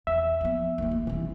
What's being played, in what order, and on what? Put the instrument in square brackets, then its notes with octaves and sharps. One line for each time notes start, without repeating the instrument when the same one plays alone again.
[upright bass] E2 [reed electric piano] E5
[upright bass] F3 B3
D#2 G3
A3
[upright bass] C3 G3 [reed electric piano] E3